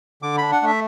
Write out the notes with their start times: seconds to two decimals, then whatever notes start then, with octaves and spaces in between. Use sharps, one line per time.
0.22 D3 D6
0.38 D4 B5
0.52 F#5
0.62 A3 E5